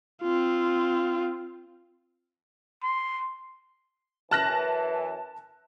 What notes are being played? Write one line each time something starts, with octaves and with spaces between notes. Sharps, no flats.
C4 F4
C6
F#2 E3 A5 F#6 A#6